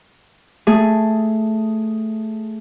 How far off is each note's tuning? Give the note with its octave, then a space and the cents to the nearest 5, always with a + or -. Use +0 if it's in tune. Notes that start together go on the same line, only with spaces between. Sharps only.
A3 +0 G#4 +0